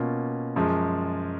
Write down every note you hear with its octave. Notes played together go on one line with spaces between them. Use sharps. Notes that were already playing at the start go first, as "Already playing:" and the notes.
Already playing: B2 A#3 C#4 F4
F#2 F3 G#3